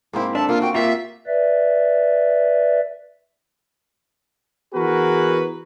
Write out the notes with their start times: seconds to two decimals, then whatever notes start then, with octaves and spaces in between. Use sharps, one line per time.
0.13 G#2 A#3 C4 E4
0.35 D4 A4 E5 A5
0.49 A#3 F4
0.62 F#4 G5
0.74 A#3 F4 G4 E5
1.27 B4 D5 E5
4.74 E3 B3 F#4 G#4 A#4 B4